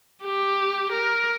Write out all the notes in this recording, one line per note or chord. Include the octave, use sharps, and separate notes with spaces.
G4
A#4